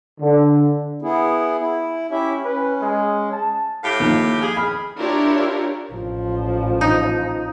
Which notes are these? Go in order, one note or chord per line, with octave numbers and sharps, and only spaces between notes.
D3
B3 E4 G#4
E4
C#4 E4 G4 E5
C#4 B4
G#3
A5
A2 G4 F5
D#3 F3 A#3
G#4
B5 F6
D4 E4 F4 G4 A#4 C#5
A1 F3
D#4